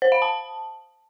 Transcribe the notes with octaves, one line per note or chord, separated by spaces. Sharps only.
C5
F5
A5